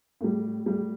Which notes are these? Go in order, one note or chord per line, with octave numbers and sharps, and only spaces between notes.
A2 G3
A2 G3